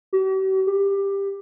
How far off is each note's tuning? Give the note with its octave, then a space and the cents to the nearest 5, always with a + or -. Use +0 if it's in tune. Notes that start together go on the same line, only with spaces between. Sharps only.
G4 -45
G4 +15